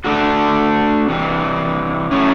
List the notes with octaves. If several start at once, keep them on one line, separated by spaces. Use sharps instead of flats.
A3 D4 F#4 A4
C3 E3 G3
F#3 A3 C#4 E4